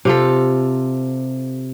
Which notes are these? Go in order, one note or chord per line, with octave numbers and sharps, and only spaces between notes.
C3 F4 A4